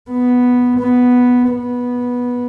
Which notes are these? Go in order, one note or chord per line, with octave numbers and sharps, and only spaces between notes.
B3
B3
B3